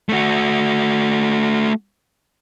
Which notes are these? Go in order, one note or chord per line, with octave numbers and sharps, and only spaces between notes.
A3 F#4